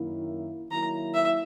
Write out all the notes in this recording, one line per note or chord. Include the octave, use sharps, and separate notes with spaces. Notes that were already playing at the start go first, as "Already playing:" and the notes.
Already playing: F#2 D#3 A#3 E4
D#3 F#3 A#3 E4 A#5
E5